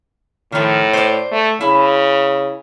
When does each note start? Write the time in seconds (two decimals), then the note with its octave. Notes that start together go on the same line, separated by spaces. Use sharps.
0.52 A2 D#3 F3
0.93 C5 D5
1.32 A3
1.61 C#3 E4